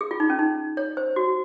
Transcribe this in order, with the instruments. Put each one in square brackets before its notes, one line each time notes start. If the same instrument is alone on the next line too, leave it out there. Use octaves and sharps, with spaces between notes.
[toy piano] G#4
F4
D#4
C#4
D#4
C#5
C5
F#4